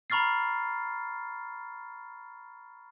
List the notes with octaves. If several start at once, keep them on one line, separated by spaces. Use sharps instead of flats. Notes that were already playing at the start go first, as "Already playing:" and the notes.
A#5 B5 C#6 F6 A6 C7